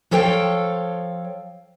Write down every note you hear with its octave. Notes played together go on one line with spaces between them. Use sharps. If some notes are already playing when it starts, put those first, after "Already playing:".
F3 A4 C#5 F5 G5